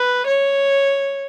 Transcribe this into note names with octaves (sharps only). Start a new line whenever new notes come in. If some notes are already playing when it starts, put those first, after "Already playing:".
Already playing: B4
C#5